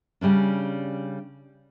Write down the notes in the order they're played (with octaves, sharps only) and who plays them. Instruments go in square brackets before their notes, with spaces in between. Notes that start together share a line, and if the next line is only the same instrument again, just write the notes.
[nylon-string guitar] C#3 G3 C#4 D4